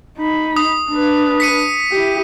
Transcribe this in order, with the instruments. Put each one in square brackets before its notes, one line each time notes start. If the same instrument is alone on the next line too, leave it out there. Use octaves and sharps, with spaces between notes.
[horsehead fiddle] D#4 B5
[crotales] D#6
[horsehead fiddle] D4 B4
[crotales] B6 C#7 D#7
[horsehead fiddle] E4 G4